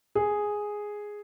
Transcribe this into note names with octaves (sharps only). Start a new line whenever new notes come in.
G#4